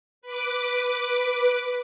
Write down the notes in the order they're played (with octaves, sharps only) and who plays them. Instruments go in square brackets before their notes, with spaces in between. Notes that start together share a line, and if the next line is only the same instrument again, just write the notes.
[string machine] B4 D6